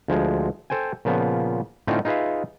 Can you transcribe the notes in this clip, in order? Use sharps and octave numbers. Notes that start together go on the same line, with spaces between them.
D2 F3 G#3
A4 C5 G5 G#5
A#2 C#3 F3 B3
A2 D3 C4 C#4 D#4 F4
D#4 F4 G#4 B4 E5 F5